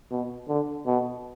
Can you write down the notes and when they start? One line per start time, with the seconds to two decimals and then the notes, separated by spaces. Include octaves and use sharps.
0.11 B2
0.48 D3
0.86 B2